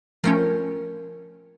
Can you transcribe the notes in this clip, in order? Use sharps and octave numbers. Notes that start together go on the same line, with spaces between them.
F3 A3 C#4 A#4 G5